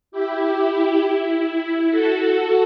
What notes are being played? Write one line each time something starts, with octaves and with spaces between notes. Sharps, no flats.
E4 G4
E4
E4
F#4 A4